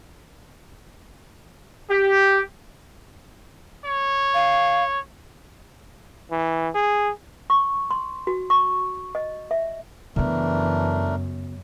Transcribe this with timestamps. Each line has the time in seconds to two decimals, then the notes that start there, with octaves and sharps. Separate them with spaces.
1.89 G4
3.85 C#5
4.34 F5
6.31 E3
6.75 G#4
7.50 C#6
7.91 C6
8.27 F#4
8.50 C#6
9.15 D#5
9.51 E5
10.16 F#2 C#3 E3 A3 B3 D4 A#4